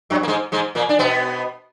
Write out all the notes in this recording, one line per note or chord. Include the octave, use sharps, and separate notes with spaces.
F#2 F#3
A#3
G#2 G#3
G#2 G#3
A#2 A#3
D4
B2 B3